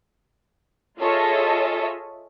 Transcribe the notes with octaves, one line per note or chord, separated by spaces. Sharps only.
F4 G#4 A4 C#5 D#5 E5